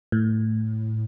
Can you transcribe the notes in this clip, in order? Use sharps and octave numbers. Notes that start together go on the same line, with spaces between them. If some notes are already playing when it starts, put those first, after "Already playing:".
A2